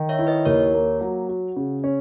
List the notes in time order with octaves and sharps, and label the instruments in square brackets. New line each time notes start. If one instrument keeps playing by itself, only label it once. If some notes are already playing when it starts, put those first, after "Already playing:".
Already playing: [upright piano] D#3
[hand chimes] C#5 E5
[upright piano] E4
[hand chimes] B4 D#5
[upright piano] D#2 [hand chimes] A#4 C#5
[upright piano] A#3
F#3
F#4
C#3
C#4